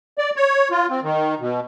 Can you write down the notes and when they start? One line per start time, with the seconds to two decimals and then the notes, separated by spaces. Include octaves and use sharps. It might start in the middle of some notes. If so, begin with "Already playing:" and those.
0.18 D5
0.36 C#5
0.71 F4
0.90 C4
1.03 D#3
1.40 B2